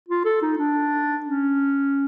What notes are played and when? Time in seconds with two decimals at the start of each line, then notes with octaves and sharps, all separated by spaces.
0.09 F4
0.25 A4
0.42 D#4
0.58 D4
1.26 C#4